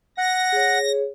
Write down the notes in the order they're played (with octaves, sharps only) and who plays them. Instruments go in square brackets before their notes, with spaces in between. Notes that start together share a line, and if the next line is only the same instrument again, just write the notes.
[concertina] F#5 [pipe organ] A#6
[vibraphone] G#4 C#5